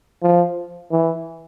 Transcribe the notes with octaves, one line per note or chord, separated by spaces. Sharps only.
F3
E3